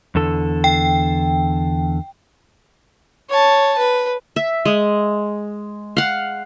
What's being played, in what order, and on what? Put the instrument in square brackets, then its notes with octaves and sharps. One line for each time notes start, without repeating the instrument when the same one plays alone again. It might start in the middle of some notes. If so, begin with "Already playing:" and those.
[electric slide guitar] E2 D3 A4
[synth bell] G5
[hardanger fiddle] C#5 A5
B4
[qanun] E5
G#3
F5 F#5